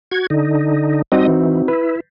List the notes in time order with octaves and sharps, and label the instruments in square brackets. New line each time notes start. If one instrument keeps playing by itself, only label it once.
[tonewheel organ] F#4 G#6
D3 D#4
[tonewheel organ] G3 D#5 [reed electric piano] C4 D#4 F#4
[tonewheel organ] E3
[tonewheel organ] E4 [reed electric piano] B4